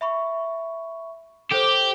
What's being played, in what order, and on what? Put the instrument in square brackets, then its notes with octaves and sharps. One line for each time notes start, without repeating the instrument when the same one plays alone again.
[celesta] E5 B5 C#6
[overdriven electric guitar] G4 [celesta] A4 C5